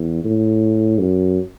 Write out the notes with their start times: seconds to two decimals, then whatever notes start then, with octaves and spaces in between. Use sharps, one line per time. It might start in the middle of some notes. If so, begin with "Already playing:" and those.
Already playing: E2
0.24 A2
1.00 F#2